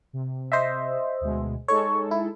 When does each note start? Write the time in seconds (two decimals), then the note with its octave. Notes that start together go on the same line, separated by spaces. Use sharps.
0.13 C3
0.52 C5 D#5 E5
1.21 D2 B2 G#3
1.68 G#3 D#4 A4 C#5 C#6
2.11 E4